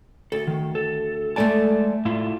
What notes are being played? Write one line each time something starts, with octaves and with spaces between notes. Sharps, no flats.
D2 A4
D#3
A4
G#3 A3 A4 D5 G#5 A5
A2 E4 F4